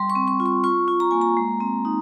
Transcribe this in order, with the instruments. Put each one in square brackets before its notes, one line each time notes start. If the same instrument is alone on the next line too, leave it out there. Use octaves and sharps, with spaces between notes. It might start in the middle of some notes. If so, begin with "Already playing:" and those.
Already playing: [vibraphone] G3 C6
C#6
C4
C#6
F4
C#6
F4 C#6
F4
A#5
A#3 G#5
A#5
G#3
C4
D#4